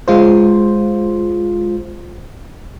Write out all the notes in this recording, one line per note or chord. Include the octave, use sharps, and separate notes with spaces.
G#3 F4 C5